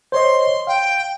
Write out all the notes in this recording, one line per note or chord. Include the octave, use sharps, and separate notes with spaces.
C5 C#5 D#5 C6
F5 G5